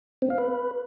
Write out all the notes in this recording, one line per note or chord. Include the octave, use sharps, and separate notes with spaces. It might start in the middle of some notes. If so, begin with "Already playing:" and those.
C4
F5
B4